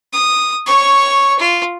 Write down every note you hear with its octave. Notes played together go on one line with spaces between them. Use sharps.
D#6
C#5 C#6
F4